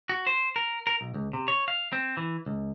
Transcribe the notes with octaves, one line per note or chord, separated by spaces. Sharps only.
F#4
C5
A#4
A#4
B1
C#2
C3
C#5
F5
C4
E3
C#2